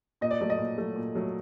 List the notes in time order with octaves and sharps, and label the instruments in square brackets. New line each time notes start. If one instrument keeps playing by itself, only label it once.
[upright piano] A#2 D#5
D5
F#3 A3 D5
D#5
A#2
F#3 A3
A#2
F#3 A3